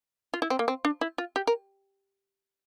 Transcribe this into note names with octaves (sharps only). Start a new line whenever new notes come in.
F4
E4
C4
A#3
C4
D4
E4
F4
G4
A#4